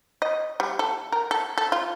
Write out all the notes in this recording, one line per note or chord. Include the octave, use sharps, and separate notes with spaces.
D#5
G3
A4
A#4
A4
A4
F4